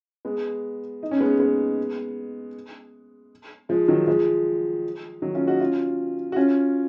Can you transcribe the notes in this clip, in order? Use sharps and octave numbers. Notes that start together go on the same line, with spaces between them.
G#3 B3
D#4
C#4
G#3 B3
G#3 B3
F3 G#3
D#3 F#3
F3 G#3
D#3 F#3
C#4 F4
D#4 F#4
C#4 F4
F#4
C#4 F4